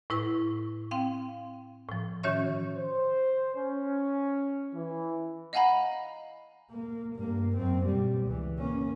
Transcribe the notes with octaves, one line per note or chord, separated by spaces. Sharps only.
A2 E4 B4 C#6
C4 F5 G5
A2 F3
D#3 C#4 F#4 C#5 E5 C#6
C5
C#4
E3
D#5 F5 F#5 G#5 A#5 B5
A#3
G2 A#3
F#2 C4
B2 G3
C#2 E3
A#3 C#4